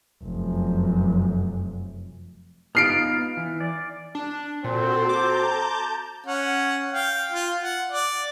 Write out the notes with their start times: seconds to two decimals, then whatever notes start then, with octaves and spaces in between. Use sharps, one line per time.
0.24 F1 F#2
2.75 B3 D#4 F4 F6 C7 D7
3.37 E3
3.60 D5
4.15 D4
4.64 A#2 C4 F#4 A4 C5
5.09 A5 A#5 D6 G6
6.26 C#4 F#5
6.91 F5 G5
7.31 F4
7.63 F#5
7.92 D5